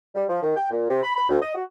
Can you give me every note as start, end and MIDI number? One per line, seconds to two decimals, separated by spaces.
0.15 0.24 55
0.29 0.42 53
0.43 0.54 51
0.56 0.68 79
0.71 0.89 46
0.89 1.00 48
1.03 1.15 83
1.15 1.29 83
1.29 1.38 38
1.42 1.52 75
1.54 1.63 66